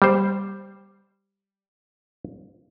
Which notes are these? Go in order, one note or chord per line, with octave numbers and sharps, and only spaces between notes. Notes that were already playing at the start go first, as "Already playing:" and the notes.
G3 C5